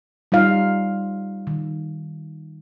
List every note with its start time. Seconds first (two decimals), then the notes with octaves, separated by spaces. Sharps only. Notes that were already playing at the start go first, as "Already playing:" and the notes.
0.32 G3 D#4 F4 F5
1.47 D#3